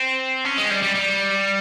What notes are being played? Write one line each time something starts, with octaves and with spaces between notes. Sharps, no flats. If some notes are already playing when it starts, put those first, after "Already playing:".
Already playing: C4
C#4
G#3
G3
G3
G3